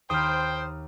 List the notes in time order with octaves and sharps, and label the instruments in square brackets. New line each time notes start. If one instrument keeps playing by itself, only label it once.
[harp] D#2 B5 [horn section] C5 G5 [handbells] D#6 F6